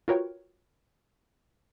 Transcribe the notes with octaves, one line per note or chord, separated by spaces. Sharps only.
F4 F#4 A#4 B4 C#5 G5